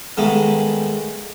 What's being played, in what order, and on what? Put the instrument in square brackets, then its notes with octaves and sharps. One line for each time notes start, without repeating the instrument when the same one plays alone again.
[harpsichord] G2 D#3 G#3 A3 B3